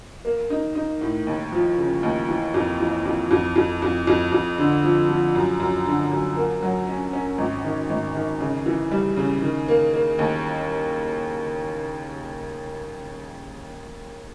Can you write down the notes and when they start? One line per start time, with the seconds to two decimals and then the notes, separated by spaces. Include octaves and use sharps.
0.25 A#3
0.50 D#4
0.75 D#4
1.01 A2
1.27 D#2
1.52 F3
1.78 C#3
2.03 D#2
2.29 E3
2.54 F2
2.80 E3
3.05 F2
3.31 F2
3.56 F2
3.82 F2
4.07 F2
4.32 F2
4.58 D3
4.83 F3
5.09 F3
5.35 F#2
5.60 F#2
5.86 D3
6.11 F#2
6.37 A#3
6.63 F#3
6.87 C#4
7.13 C#4
7.38 G#1
7.64 D#3
7.90 G#1
8.15 D#3
8.40 C#3
8.66 E3
8.91 G3
9.17 C#3
9.42 D#3
9.68 A#3
9.93 A#3
10.19 D#2